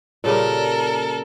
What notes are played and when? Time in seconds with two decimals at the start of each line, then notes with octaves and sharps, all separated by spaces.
0.24 A#2 C#3 G3 A4 A#4